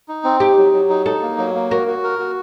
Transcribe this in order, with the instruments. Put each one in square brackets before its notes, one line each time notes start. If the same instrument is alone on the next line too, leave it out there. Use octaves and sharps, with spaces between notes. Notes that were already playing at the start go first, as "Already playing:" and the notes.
[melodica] D#4
C4
[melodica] D#4 [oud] G4
[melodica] F#3
F#3
D#4
[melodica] D#4 [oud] A4
[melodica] A#3
F#3
A#3
[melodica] F#4 [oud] A#4
[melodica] F#4
A#4
F#4